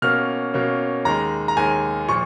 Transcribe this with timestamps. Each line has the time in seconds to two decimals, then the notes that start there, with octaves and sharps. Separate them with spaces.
0.02 B2 A#3 C#4 F6
0.54 B2 A#3 C#4
1.05 D#2 D#3 G#3 A#5
1.48 A#5
1.57 D#2 D#3 G#3 G#5
2.08 A#2 F3 C#6